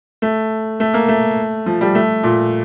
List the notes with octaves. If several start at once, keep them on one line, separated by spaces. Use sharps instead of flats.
A3
A3
A#3
A3
F3
G3
A3
A#2